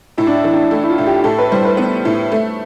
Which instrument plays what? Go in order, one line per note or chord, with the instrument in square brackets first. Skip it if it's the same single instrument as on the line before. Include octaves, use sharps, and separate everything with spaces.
[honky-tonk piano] A2 [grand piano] E4
[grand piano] D4
E4
[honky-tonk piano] E3
[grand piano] D4
[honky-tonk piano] A3 [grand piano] E4
[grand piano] E4
F4
[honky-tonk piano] A2
[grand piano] G4
[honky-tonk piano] A2 [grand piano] A4
[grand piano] B4
[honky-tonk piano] G3 [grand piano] C5
[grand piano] B4
[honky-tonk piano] B3
A2
A3